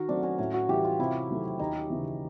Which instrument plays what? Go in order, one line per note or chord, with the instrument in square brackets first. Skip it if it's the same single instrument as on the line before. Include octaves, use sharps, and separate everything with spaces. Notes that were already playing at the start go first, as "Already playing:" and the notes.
Already playing: [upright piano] D#3 [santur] F#4 A#4
[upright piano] F#3 A3 C4 [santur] D4
[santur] C#4
[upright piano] A2 [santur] C#4
[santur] F#4
[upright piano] E3 G3 [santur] G4
[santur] F4
[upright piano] C3 [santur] E4
[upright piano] D#3 F#3 A3
[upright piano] D#2 [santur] D#4
[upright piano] C#3 E3